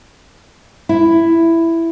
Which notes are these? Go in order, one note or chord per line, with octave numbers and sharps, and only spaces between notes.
E4